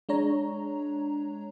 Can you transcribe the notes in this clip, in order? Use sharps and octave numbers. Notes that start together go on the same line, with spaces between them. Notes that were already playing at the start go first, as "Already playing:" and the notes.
G#3 D4 C#5 A#5